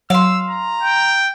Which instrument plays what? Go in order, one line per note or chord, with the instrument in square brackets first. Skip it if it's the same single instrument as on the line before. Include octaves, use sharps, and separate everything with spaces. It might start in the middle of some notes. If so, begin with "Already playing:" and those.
[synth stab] F#3 [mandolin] F5 C6 [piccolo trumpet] E6
[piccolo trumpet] A#5
[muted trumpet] G5